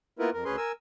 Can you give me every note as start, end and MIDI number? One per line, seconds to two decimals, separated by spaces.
0.19 0.30 58
0.19 0.30 59
0.19 0.30 64
0.19 0.30 65
0.19 0.30 70
0.19 0.30 71
0.33 0.44 41
0.33 0.44 70
0.45 0.56 38
0.45 0.56 61
0.45 0.56 68
0.45 0.56 71
0.45 0.56 84
0.57 0.72 70
0.57 0.72 80
0.57 0.72 88